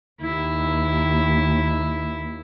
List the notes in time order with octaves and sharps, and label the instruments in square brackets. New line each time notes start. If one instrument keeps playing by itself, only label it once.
[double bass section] D#2 [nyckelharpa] E4